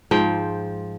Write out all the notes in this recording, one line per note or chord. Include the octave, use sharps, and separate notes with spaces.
G#2 F3 G5